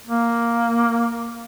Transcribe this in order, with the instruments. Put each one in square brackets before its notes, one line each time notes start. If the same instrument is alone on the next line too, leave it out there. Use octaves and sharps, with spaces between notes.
[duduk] A#3